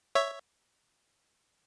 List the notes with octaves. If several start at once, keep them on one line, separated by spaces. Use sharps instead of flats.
C#5 E5